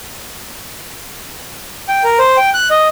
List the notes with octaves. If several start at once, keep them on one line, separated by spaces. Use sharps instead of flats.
G5
A#4
C5
G5
F#6
D#5